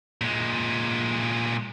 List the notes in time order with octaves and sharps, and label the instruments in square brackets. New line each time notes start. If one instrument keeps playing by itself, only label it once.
[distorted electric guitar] A#2 G#3